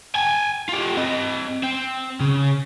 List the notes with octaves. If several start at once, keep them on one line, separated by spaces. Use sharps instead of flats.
G5 G#5
F4 G4
C4 D#5
C4
C#3